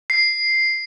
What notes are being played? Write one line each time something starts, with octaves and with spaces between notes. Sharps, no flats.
C7